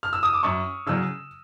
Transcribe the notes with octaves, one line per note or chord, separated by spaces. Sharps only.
F6
E6
D#6
D6
F#2 C#6
C#3 F#3 E6